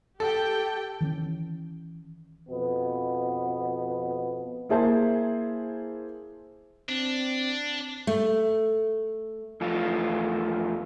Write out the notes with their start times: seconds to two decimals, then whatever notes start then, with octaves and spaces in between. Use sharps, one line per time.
0.20 G4 A4 G5
1.01 D#3 E3 G3 C#4
2.48 F2 B2 B3
4.69 A#3 E4 G#4 C5 A5
6.89 C4 D4
8.07 A3
9.61 E2 F3 A3 F4